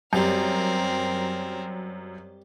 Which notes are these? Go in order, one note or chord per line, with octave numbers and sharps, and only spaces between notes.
F#2 G3 C4 G4 A#4 A#5